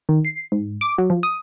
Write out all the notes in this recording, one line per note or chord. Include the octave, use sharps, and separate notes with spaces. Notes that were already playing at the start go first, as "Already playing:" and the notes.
D#3
C7
G#2
D6
F#3
F3
D#6